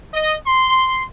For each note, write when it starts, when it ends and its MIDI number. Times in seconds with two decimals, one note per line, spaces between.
0.13 0.34 75
0.46 1.02 84